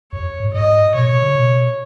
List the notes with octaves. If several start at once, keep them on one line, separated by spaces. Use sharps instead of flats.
F2 C#5
G#2
G#2 D#5
B2 C#5
B2
C#3
B2